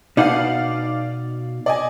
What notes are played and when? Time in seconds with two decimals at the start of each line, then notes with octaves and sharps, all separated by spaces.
0.17 B2 D#4 D5 F5 F#5
1.66 D5 D#5 G#5